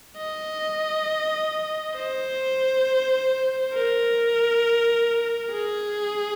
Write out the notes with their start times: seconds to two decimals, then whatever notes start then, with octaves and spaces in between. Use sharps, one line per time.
0.18 D#5
1.96 C5
3.74 A#4
5.51 G#4